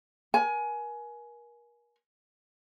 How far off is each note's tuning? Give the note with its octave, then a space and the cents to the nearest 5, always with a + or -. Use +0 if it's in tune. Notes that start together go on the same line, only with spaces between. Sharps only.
A#4 +35 G#5 +20